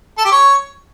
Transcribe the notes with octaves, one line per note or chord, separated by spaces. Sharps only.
A4
G4
C#5